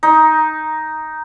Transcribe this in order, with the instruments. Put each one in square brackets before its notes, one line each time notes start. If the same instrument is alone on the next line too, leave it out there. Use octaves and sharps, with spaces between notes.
[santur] D#4